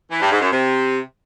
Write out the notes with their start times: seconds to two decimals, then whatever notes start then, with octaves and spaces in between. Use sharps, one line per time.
0.11 E3
0.21 G2
0.31 G#2
0.41 F#2
0.51 C3